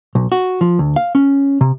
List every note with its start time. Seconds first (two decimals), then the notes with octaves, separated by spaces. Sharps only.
0.15 B1
0.32 F#4
0.61 F3
0.79 D2
0.96 F5
1.15 C#4
1.61 C3